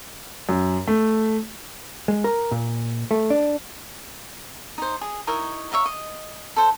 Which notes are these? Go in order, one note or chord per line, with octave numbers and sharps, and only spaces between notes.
F#2
A3
G#3
A#4
A#2
A3
D4
D#4 C5
G#4
D#4 E4 A#4 C#5
C#5 E5 F5 A#5
D#5
A4 C5